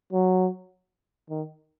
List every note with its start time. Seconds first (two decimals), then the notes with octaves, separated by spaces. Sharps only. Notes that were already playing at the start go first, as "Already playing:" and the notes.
0.13 F#3
1.30 D#3